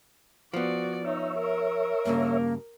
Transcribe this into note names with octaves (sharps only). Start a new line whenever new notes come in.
F3 B3 F#4 D5
D#4 C#5 E5
A#4
G2 C#3 A#3